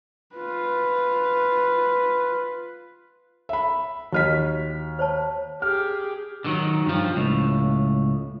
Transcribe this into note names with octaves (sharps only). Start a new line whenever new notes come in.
F4 B4
E5 B5
D#2 F4 F#4 D#5 F6 B6
C5 C#5 A5
G4 G#4 F6
D3 D#3 F#3
G2 F3
C#2 A2